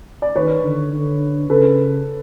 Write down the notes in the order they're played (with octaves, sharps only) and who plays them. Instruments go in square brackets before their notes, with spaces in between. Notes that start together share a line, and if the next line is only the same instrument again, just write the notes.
[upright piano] D5
[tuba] D#3 [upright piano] B4 C#5
[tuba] D3
D3
[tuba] C#3 [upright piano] A4 B4